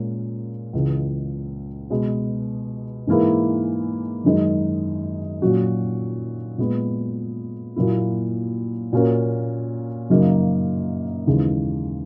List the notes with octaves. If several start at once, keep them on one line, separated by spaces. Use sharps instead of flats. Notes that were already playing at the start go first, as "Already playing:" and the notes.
Already playing: A#2 G#3 C#4 A#4
C#2 C#3 E3 G#3
B2 G#3 B3
G#2 E3 A#3 E4 G#4
F#2 D#3 G#3 D#4
A#2 F#3 C#4 F#4
A#2 G#3 B3
A#2 F#3 A#3 E4
A#2 A#3 C#4 F#4 A#4
F#2 C#3 F#3 A#3 D#4
D#2 C#3 E3 G#3